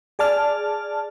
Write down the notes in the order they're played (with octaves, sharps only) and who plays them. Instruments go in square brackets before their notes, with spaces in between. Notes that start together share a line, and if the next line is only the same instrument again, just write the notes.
[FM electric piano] G#4 D5 A5 F6